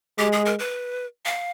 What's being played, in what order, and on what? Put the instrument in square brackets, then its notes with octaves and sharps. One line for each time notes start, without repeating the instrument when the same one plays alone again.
[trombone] G#3 [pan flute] G4
[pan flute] G#4
A#4
B4
F5